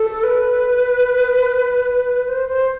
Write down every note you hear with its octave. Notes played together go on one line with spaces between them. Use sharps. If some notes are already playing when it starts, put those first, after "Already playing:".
Already playing: A4
B4
C5
C5